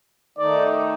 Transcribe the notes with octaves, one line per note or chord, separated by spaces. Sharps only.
D#3 A3 D#4 D5